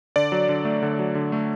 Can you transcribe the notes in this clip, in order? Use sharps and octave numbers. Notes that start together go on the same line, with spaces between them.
D3 D5
F#3
D3
A3
D3
F#3
D3
A3